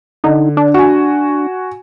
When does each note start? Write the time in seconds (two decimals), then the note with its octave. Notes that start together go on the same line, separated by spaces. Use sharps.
0.24 D3 D#4
0.57 D4
0.74 F#4 G#5